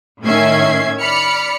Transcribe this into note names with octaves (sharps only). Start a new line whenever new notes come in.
A2 D#3 C#4 E5 G#6 C7
D5 B5 F6 C#7